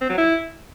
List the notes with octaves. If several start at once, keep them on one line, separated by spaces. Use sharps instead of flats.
C4
F#3
E4